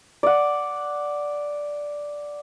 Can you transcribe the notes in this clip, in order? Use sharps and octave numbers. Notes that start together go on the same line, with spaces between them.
D5 F#5